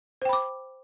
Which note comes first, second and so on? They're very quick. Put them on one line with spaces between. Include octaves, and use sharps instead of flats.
C5 G5 B5 D6